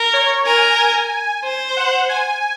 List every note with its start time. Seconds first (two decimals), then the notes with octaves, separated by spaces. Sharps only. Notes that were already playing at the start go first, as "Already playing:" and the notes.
Already playing: A#4
0.13 C#5
0.46 A#4 G#5
1.44 C5
1.77 F#5
2.09 G#5